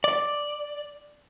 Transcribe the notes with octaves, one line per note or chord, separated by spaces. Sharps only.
D5